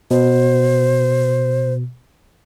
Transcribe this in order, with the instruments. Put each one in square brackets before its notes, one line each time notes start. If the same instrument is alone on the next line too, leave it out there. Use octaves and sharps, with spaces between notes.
[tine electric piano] B2 [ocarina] C5